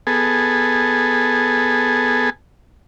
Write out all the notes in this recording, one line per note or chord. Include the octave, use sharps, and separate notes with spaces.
B3 G#4 A4